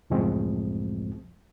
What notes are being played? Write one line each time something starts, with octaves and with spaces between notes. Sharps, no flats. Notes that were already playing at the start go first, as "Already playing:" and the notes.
C#2 F#2 A2 F3 G#3 C4